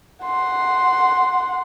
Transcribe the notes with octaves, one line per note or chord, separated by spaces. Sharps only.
F#5 C6